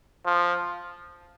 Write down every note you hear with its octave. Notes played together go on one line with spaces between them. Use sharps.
F3